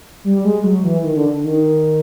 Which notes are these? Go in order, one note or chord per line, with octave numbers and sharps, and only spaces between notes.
G3
G#3
F#3
E3
D#3
D3
D#3